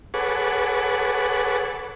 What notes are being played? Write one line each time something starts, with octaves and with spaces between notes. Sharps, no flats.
G#4 A4 B4 C#5 F#5 D6